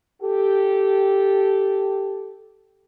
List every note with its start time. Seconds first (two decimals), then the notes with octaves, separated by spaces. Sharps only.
0.21 G4 A4